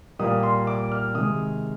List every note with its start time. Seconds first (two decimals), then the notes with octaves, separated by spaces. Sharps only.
0.19 A#2 G3 A#3 D#6
0.43 C6
0.67 D6
0.92 F6
1.14 C3 D#3 G#3 D#6